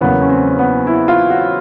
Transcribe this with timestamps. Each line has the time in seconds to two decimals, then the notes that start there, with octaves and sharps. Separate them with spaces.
0.01 E2 C#3 F#3 A#3 B3
0.22 C#4
0.30 C4
0.59 B3
0.87 E4
1.08 F4
1.30 F#4